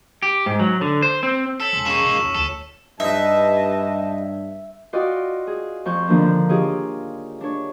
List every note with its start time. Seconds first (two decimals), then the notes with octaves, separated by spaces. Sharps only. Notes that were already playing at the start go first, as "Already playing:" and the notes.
0.22 G4
0.46 G#2
0.59 F#3
0.81 D3
1.02 C5
1.23 C4
1.60 A4 C#5 E6 B6 F#7
1.73 E1 G#5 A5 C6
1.86 A#3 C#4 D#4 G#4 A5 C#6 E7
2.00 G#1 B2
2.18 F2 D#4 F4 C#5
2.35 D2 A4
3.00 G2 D#4 B4 D#5 E5 A5
4.93 F4 F#4 D5 D#5 G5
5.47 G#4
5.85 F2 C#6 G6
6.08 D3 D#3 F3 A#3 D4
6.49 F4 G4 G#4 C#5 D#5
7.41 D4 C#5